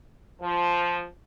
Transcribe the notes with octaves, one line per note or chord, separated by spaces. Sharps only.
F3